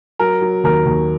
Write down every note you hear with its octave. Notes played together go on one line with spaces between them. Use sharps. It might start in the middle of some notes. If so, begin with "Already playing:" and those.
F#3 A#4
F#3
D#2 A#4
D#2